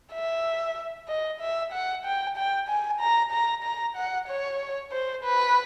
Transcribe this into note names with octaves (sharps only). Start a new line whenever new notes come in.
E5
D#5
E5
F#5
G5
G5
G#5
A#5
A#5
A#5
F#5
C#5
C5
B4